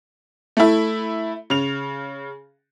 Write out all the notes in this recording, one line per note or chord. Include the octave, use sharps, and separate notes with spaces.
A3 E4
C#3 F7